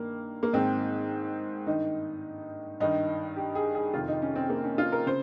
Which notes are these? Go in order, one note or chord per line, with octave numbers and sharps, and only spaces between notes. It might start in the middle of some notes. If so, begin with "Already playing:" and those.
Already playing: G2 D#3 A#3
A#3
G#2 D#3 C4
G2 D#3 D#4
G2 D#3 D#4
G4
G#4
G#4
F2 C3 D#3 F4
D#4
C#4
C4
A#3
C#4
F4
A#4
C#3 C5